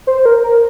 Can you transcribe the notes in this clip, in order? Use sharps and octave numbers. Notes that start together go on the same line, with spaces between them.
C5
A#4
A#4